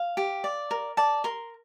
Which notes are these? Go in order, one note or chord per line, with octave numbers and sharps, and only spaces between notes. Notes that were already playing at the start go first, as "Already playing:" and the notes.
Already playing: F5
G4
D5
A#4
D5 A5
A#4 C6